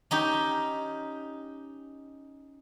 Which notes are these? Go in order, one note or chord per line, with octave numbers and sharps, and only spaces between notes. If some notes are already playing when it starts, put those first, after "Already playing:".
C#4 D#4 G4